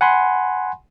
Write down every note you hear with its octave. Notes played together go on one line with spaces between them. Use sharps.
F#5 G#5 B5 C6